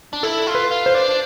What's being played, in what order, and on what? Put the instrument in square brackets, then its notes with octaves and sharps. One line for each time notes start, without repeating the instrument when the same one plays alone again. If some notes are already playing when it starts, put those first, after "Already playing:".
[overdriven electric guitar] D4
[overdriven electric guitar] E4 [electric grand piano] A4
[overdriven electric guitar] F4
[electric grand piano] B4
[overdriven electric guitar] F4
[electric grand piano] C5
[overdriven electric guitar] D4